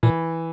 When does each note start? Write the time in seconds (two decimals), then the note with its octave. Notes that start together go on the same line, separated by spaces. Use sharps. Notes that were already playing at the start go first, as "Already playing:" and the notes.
0.03 A#2 E3